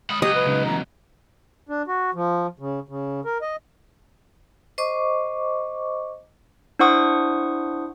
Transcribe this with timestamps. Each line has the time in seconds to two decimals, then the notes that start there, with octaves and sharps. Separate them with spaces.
0.10 G#3 B5 D#6
0.22 C#2 F#3 G4 D#5
0.35 B4
0.46 C#3 G#3 D#4
0.66 C#3 E3 B3 A#5
1.69 D4
1.87 F#4
2.14 F3
2.59 C#3
2.89 C#3
3.25 A#4
3.42 D#5
4.78 C5 D#5 C#6 D6
6.79 D4 E4 C5 F#5 C#6 D#6